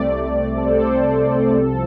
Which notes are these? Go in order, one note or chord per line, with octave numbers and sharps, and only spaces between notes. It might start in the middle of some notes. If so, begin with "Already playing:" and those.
Already playing: C2 C3 A3 C4 D5
A4
C2 C3 A3 C4 C5
C2 C3 F3 C4 A4